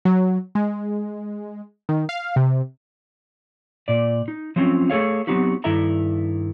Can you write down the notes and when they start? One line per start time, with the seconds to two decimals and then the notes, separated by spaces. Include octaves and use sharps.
0.05 F#3
0.55 G#3
1.89 D#3
2.09 F5
2.36 C3
3.88 A#2 D5
4.28 D#4
4.56 F3 F#3 A3 C4 C#4 F4
4.90 A3 G#4 A4 C#5 F5
5.27 F#3 B3 C4 D#4 F#4 G4
5.64 G2 D#3 E4 A4 E5 A#5